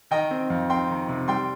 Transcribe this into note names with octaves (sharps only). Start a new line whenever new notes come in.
D#3 D#5 G5
C4
F2
C4 G5 C6
D#3
C3
G3 G5 C6